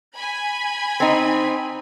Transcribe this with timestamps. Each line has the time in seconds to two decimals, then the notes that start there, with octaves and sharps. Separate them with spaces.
0.15 G#5 B5
1.00 C4 D#4